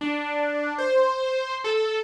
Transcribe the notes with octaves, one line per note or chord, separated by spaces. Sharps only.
D4
C5
A4